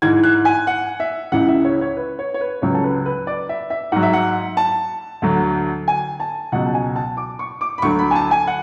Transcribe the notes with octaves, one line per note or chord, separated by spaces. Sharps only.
G#2 E3 G#6
F#6
G#5
F#5
E5
C#2 C#3 E3 F#5
E5
C#5
C#5
B4
C#5
C#5
B4
C#2 C#3 F#3 C#5
A4
B4
B4
D5
E5
E5
G#2 F#3 F#5
E5
F#5
A5
D2 D3 F#3
G#5
A5
C#2 B2 F#3 F#5
A5
G#5
A5
D6
C#6
D6
B5
D2 D3 F#3 C#6
B5
G#5
A5
G#5
F#5